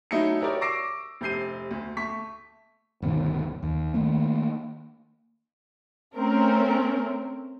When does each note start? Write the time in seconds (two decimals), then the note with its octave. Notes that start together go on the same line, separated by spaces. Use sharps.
0.11 F#3 A3 D#4 E4 F#4 C#7
0.41 E4 F#4 G4 A#4 C#5 D5
0.61 C#6 D6 E6 A#6 C7 D7
1.21 F1 C3 G6 C7 D#7
1.71 D2
1.97 A3 C#6 B6
3.02 G1 D2 B2 D#3
3.63 D#2
3.94 D#3 A3 A#3
6.15 A3 C4 C#4 A#4